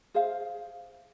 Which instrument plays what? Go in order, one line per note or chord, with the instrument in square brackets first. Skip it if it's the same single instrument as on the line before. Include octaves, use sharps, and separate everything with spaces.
[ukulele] G#4 C5 E5 F5